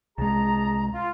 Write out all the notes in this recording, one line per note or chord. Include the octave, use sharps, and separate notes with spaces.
C2 G#3 G#4 A5 A#5
F4